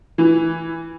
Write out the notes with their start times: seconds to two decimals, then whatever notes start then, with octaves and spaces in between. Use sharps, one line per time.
0.18 E3